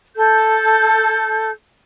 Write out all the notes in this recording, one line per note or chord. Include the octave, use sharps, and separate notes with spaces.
A4 G6